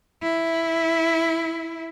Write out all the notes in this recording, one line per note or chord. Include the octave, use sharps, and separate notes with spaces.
E4